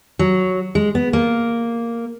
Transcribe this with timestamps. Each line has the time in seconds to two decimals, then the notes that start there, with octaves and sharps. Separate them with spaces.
0.19 F#3
0.75 G#3
0.95 B3
1.13 A#3